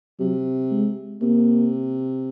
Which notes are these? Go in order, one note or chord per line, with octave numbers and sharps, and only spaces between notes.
C3 F#3
G#3
C3 A#3